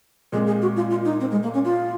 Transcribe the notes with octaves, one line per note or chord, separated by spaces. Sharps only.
A#2 G#3 C4 G#4
G#4
F#4
F4
F4
D#4
C4
G#3
A#3
C#4
F4